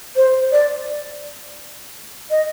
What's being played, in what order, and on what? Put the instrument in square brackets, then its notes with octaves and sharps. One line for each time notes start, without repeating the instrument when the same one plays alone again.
[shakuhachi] C5
D5
D#5